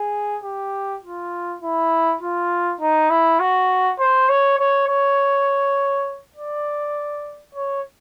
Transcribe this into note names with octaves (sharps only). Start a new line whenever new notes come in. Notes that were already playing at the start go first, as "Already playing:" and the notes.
Already playing: G#4
G4
F4
E4
F4
D#4
E4
F#4
C5
C#5
C#5
C#5
D5
C#5